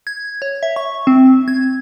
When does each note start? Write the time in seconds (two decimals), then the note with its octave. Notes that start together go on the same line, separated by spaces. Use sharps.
0.07 G#6
0.42 C#5
0.63 E5
0.76 C#6
1.07 C4
1.48 G#6